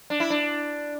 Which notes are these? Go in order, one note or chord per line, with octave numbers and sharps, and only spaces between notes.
D4
E4
D4